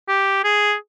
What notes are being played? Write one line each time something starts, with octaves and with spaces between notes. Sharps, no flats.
G4
G#4